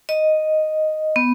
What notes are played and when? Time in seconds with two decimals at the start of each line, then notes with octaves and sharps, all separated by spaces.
0.09 D#5
1.16 B3